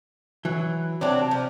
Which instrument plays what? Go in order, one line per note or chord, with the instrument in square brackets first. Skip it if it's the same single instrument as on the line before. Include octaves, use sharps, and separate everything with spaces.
[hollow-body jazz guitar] E3 F#3
[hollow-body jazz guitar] C3 [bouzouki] F#3 C4 D4
[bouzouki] F3